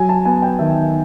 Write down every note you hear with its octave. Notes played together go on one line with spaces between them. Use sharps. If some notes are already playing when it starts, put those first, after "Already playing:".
Already playing: F#3 G#5
A5
B3 G#5
G5
D#3 E5